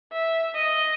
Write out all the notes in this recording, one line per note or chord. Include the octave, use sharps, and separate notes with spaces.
E5
D#5